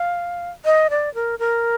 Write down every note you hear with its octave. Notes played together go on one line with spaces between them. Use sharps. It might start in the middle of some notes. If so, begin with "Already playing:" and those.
Already playing: F5
D#5
D5
A#4
A#4